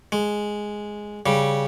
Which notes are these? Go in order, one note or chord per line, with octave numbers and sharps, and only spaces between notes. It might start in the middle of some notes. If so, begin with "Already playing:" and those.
G#3
C#3 G3